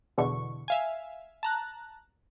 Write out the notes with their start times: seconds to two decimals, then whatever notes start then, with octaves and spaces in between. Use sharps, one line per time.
0.18 E2 B2 D3 C#6
0.68 E5 F5 G#5
1.43 A5 A#5 F#6